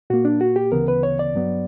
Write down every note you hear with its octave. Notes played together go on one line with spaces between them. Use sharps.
A#2 A#3 F#4
D4
F#4
G4
D2 C#3 E3 B3 A#4
B4
C#5
D5
G2 F#3 B3